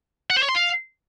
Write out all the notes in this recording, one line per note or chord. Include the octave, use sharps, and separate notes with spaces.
F#5
C5
C#5
C6
F5